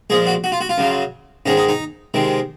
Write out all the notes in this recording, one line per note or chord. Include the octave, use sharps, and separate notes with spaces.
A#2 F3 G#3 G#4
F#4
F#4
F4
F#4
F4
F#2 C#3 F#3
G#2 D#3 G#3 C#4
D#4
D#4
C3 D#3 G#3